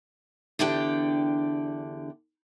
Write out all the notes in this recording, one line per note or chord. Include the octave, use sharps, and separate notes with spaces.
E2 D3 D4 G4 G5